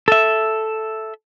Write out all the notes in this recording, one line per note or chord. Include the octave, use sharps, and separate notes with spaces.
A4 E5